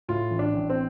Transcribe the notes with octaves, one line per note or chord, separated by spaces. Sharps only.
A2 F4
A1
D4
A1
C4